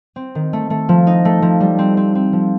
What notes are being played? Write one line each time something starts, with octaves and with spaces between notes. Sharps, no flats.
C4
D#3
A3
A3
F3
D#4
A3
F3
G3
C4
C4
C4
F3